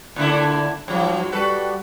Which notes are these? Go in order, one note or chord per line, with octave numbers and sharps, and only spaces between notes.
A2 D3 D4 E4
G2 F3 F#3
G3 F#4 A4 B4